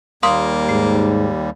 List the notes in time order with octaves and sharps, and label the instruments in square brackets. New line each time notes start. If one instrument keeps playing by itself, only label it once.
[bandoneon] D#2 G3 [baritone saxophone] A#3 [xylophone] F5 C6 D#6
[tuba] G#2 [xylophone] C7